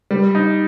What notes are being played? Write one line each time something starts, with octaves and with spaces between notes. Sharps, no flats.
G3
D#4